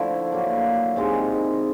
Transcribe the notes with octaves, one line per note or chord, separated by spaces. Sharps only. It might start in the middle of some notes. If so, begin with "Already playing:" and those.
Already playing: D3 F3 A3 E4
D3 F#3 A#3
C3 D#3 G#3